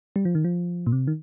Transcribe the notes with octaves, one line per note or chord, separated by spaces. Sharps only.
G3
F3
D#3
F3
A#2
C3
D#3